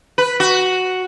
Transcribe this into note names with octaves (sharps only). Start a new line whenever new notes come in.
B4
F#4